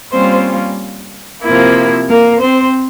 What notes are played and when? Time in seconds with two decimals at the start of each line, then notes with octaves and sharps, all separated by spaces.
0.12 G3 A#3 C4 C#4 F4 C5
1.43 C3 F3 A#3 E4
2.09 A#3 A#4
2.41 C4 C5